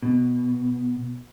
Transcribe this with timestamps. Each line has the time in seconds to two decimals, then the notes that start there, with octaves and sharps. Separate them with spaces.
0.02 B2